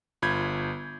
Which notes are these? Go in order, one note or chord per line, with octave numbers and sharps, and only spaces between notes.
G1 F4 B5 G6 G#6